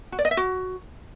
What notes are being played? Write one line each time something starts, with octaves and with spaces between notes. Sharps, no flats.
F#4
D5
D#5
E5
F#4